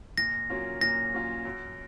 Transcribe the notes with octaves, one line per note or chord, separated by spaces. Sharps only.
A#2 A#6
F#3 A#3 C#4 F4
A#2 A#6
F#3 A#3 C#4 F4
F#2